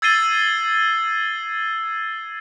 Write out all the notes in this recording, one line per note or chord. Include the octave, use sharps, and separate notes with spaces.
E6 G#6 A6 C7 D#7 G7